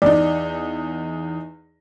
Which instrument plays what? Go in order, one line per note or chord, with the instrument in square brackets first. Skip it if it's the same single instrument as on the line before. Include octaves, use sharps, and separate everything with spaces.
[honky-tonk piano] E2 D#4 [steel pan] D5